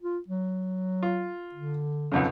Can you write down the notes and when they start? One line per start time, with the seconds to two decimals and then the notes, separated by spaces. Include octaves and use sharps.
0.01 F4
0.28 F#3
1.03 F4
1.54 D3
2.12 B1 F2 C#3